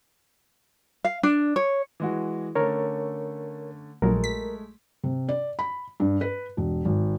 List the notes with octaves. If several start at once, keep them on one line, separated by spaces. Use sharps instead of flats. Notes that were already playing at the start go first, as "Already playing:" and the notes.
F5
D4
C#5
E3 G#3 F#4
D3 A3 C#4 A#4 C#5
A#1 F#3 G#3 A3 A#4
B6
C3
D5
B5
G2
B4
E1
G#1